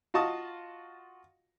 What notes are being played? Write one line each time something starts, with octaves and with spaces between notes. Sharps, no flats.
F4 F#4 D#5 A5 C#6 D#6